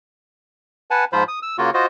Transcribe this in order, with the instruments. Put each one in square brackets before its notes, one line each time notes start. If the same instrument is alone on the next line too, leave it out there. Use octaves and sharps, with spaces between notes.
[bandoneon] B4 F#5 G#5 A5
G#2 F3 F4 C5 B5
D#6
E6
C#3 A#3 F4 F#4
F4 F#4 C5 D#5